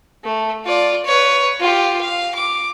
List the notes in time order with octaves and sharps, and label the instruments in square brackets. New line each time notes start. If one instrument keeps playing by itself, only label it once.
[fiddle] A3
F4 D5
B4 C#5
F4 G4
F5
D6